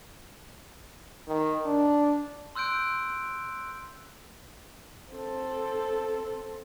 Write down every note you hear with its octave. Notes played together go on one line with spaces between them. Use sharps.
D#3
D4
C6 E6 F#6 G6 D7
C4 A4